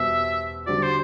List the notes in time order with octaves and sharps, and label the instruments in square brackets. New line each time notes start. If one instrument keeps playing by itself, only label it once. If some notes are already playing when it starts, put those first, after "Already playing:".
Already playing: [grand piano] E2 B2 G3 C4 F#4 [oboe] E5
[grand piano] D3 G3 C4 F#4 [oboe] D5
[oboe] C5